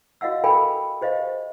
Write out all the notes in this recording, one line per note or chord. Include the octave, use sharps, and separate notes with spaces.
F#4 D#5 F5 F#5 E6
A4 A#4 F5 G5 G#5 B5
G4 C5 D#5 F5